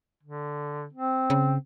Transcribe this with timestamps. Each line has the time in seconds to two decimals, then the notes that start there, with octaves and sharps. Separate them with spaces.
0.23 D3
0.93 C4
1.30 C#3